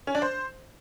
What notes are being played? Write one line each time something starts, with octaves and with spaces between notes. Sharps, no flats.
C#4
D4
C5